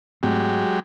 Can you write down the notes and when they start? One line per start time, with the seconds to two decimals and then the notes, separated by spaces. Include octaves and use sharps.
0.23 G#2 F#3 G#3 A3 C4 G4